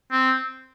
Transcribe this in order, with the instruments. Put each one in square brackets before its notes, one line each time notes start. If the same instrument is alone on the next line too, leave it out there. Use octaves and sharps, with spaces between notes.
[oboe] C4